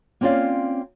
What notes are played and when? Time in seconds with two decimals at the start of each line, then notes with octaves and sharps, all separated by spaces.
0.21 A#3 C4 C#4 F4 D5 F5